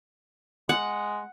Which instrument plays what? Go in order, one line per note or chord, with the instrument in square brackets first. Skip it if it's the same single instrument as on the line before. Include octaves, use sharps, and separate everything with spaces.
[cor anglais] G#3 [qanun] F#5